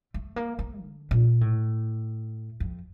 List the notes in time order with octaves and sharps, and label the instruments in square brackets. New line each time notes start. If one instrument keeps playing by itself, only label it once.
[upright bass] A3
A#3
A#3
D3
A#2
A2
F2